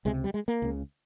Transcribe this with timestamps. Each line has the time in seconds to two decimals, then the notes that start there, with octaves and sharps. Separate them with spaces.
0.05 C#2 C3 G#3
0.24 G3
0.34 G#3
0.48 A#3
0.62 C#2 C#3